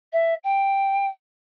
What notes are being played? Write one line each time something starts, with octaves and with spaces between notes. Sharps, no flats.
E5
G5